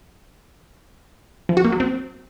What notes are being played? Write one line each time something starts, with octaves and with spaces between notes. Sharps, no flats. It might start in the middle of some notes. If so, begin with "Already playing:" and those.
F3
F#4
A#3
F#3
C4